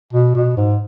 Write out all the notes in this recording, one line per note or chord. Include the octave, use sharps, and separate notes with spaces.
B2
B2
G#2